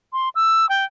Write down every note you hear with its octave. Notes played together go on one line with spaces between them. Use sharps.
C6
E6
G5